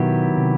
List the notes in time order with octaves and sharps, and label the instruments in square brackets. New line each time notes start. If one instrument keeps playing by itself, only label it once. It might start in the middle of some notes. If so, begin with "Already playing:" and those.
Already playing: [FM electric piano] B2 [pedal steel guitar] D#3 F#3 B3 E4 G4
[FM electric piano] C3